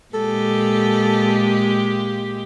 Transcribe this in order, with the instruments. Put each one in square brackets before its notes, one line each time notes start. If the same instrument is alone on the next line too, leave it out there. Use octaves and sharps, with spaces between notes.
[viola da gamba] A#2 G#3 G4 [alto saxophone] A4